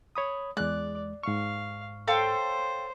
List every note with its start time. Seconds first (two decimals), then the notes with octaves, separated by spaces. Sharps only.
0.15 C#5 B5 D#6
0.57 E2 G#3 D5 F#6
1.23 G#2 F5 C#6
2.08 A4 C5 C#5 F5 G5